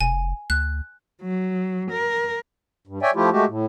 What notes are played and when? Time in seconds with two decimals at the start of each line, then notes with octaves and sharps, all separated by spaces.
0.01 F1 G#5
0.50 D2 F#6
1.22 F#3
1.91 A#4
2.87 G2
3.02 C#5 D5 E5 G5 G#5
3.15 F3 A3 E4 F4 G4
3.32 G#3 A3 F#4 G4
3.48 A2